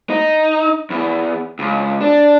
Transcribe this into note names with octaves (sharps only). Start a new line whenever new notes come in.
D#4
E2
C#2
D4